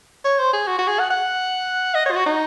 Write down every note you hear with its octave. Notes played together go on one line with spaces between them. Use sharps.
C#5
C5
G#4
F#4
F#4
G#4
F#5
F#5
D#5
C#5
F4
F#4
D#4